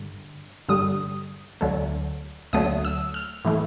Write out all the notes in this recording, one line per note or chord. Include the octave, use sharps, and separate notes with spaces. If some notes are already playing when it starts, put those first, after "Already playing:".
Already playing: G2 D3
G2 D3 G3 D#6
D2 D3 F#3 A3
D2 D3 F#3 A3 D#6
E6
F6
A2 E3 A3